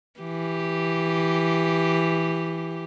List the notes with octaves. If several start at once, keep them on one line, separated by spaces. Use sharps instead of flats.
E3 G4